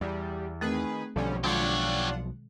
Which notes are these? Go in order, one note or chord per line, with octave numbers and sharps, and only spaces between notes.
E2 G3
D#3 A3 C4 G#4 B4
B1 D3 F3 G3 C#4
B2 D#3 G#3 D4 F4 G4 C#5 F#5